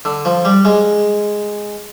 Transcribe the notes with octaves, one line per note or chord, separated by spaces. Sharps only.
D3
F3
G3
G#3